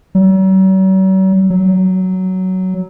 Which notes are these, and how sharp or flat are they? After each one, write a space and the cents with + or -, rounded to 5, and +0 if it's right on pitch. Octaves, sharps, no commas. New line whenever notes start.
F#3 +45
F#3 +10